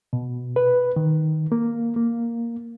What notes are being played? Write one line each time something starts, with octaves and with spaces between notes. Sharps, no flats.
B2
B4
D#3
A#3
A#3